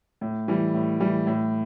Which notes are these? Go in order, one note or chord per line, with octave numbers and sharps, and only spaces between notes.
A2
E3 G3
A2
E3 G3
A2